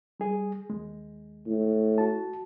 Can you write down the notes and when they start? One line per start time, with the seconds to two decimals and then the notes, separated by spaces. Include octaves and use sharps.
0.20 G3 G#4
0.70 D#2 G#3
1.47 A2
1.98 F#4 A5